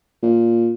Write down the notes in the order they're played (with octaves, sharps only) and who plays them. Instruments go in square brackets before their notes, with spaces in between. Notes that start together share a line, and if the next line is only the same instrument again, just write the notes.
[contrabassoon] A#2